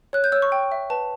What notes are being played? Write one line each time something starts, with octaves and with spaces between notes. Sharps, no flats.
C#5 F#6
G6
C#5 E6
C#6
G5
E5
B4 A5